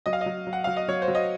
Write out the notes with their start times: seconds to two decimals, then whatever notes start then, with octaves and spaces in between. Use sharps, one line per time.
0.06 F#3 D#5
0.13 F5
0.21 D#5
0.26 F#3
0.47 F#3
0.53 F#5
0.64 F#3 F5
0.77 D#5
0.88 F#3 C#5
1.02 C5
1.08 F#3
1.15 D#5